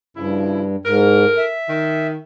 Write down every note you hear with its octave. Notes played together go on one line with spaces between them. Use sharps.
G2 C#3 F3 E4
G#2 E4 A4 A#4
E5
D#3